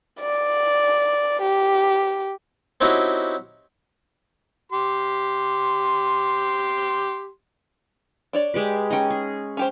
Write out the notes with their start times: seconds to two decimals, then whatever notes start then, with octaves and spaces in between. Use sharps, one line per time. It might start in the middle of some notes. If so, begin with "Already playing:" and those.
0.20 D5
1.42 G4
2.81 C4 C#4 D#4 E4 F#4 G4
4.72 G4 C6
8.33 D4 C#5 D5
8.54 G#3 G4 B4
8.90 C#4 D#4 D#5 G5
9.10 G#4
9.57 C#4 G4 C5